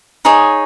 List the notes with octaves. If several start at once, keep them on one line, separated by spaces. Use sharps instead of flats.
D#4 G#4 C#5